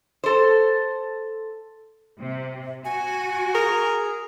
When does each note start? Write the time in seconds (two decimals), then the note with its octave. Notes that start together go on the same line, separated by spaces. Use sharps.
0.24 A4 C5
2.20 C3
2.85 F#4 G#5
3.54 G#4 A#4